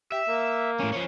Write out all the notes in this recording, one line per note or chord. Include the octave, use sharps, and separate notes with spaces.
G4 E5
A#3
A2 C#4
F3 C#4